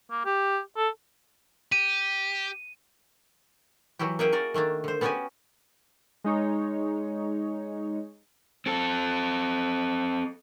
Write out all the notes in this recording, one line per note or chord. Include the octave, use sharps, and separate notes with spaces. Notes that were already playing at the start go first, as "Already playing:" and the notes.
A#3
G4
A4
G4 D#7
E3 F#3 E4 F#4 G4
A#3 C#4 G#4 E5 F#5 G5
F#4 A#4 D5
D#3 A3 A#3 D4
D3 C5
B3 C#4 F#4 G4 C#5 G#5
G#3 D#4 C#5
C4 A4